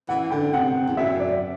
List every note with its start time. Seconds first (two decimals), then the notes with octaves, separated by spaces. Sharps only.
0.09 E3 F#5
0.30 D3 G5
0.53 C3 F#5
0.88 E2
0.97 F#2 E5
1.20 D5